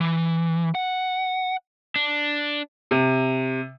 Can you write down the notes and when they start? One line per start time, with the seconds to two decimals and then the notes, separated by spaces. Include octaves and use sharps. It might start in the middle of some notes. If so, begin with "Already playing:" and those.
0.01 E3
0.75 F#5
1.96 D4
2.91 C3